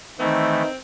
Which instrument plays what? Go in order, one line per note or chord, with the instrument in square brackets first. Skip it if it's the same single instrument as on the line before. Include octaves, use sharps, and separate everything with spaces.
[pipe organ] D#3 E3 A3 [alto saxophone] C4 [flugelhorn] D#4